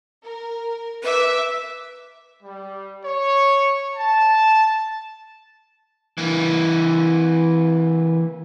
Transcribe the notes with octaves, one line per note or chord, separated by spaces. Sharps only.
A#4
B4 E5 D6
G3
C#5
A5
E3 A#3